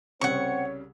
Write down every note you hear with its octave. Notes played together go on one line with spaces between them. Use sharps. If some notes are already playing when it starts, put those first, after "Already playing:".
C2 C#3 G3 C4 C#5 F#5 C#6